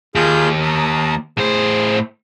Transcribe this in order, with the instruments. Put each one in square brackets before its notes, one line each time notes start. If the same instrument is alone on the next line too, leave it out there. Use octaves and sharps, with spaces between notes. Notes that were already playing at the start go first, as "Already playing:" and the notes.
[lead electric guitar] D#2 [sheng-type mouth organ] F4 G#4 G6
[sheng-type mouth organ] A5 A#5 D#6
[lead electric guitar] A2 C5 [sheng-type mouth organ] G#4